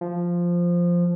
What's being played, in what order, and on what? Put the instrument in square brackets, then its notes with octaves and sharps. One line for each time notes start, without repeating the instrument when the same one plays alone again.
[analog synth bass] F3